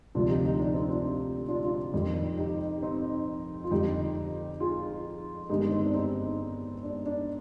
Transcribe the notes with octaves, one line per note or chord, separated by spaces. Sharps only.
D2 C3 F3 D4 F4
D#4 G4
D#4 G4
D4
C4 D#4
D4 F4
D4 F4
D4 F4
F2 D#3 G3
D#4 G4
C4 D#4
F4
F2 D3 G3 D#4 G4
F4 G#4
G1 G2 D#3 G#3 D#4 G4
C4 D#4
D4
C4 D#4
D4
D4